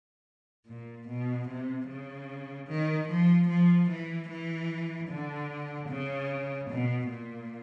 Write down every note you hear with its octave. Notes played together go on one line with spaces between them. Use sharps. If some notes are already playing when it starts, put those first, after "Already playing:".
A#2
B2
C3
C#3
D#3
F3
F3
E3
E3
D3
C#3
B2
A#2